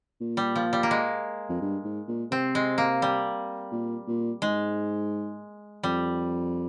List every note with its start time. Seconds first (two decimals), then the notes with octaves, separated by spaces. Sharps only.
0.21 A#2
0.37 G3
0.56 F3
0.73 G3
0.83 A#3
0.91 G#3
1.49 F2
1.61 G2
1.84 G#2
2.08 A#2
2.31 C3 C4
2.55 G#3
2.78 A#3
3.02 G3
3.72 A#2
4.07 A#2
4.42 G#2 G#3
5.83 F2 G3